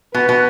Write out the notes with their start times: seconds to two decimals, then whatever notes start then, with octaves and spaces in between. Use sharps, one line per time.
0.15 B2 B4
0.29 B2